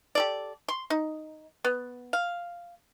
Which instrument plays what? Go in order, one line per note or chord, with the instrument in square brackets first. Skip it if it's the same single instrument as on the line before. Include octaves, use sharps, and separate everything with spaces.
[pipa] G4 A4 D5
C6
D#4
B3
F5